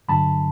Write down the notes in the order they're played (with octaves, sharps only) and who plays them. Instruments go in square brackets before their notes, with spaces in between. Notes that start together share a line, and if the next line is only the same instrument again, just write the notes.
[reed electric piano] G2 D3 F#3 A5 B5